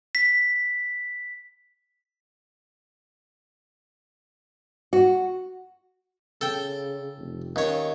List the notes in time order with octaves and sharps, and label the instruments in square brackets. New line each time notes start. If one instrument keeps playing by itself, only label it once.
[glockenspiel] B6
[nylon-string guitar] F#4
[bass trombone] C#3 [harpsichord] A4 G5
[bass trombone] F1
[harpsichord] D#2 C#5 [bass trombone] C#4